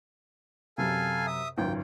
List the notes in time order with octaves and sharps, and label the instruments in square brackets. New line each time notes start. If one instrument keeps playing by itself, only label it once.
[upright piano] F#2 C3 [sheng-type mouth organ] A4 F5 G#5
[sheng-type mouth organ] E5 D#6
[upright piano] G#1 C#2 F#2 [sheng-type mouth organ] G5